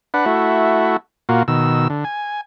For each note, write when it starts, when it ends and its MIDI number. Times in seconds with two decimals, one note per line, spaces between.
0.14 0.25 62
0.14 0.25 71
0.14 0.25 78
0.26 0.97 57
0.26 0.97 64
0.26 0.97 66
1.29 1.43 46
1.29 1.43 58
1.29 1.43 65
1.29 1.43 66
1.48 1.88 47
1.48 1.88 51
1.48 1.88 88
1.90 2.04 50
2.05 2.41 80